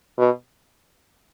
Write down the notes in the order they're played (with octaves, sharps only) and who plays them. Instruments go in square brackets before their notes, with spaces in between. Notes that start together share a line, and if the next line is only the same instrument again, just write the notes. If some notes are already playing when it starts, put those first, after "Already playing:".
[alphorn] B2